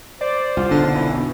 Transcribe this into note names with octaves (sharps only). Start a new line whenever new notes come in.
C5 D5
C2 F4
F#1 B1 D3
E3
B2